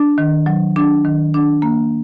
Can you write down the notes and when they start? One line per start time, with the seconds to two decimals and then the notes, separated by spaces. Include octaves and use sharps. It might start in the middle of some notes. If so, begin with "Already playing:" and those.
Already playing: D4
0.18 D#3
0.46 F#3
0.76 D4
1.05 D#3
1.34 D4
1.62 A#3